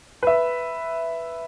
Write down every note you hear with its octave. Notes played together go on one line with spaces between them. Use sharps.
B4 E5